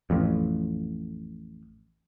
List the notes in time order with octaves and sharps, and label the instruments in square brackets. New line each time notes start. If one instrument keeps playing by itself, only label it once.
[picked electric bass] A1 F2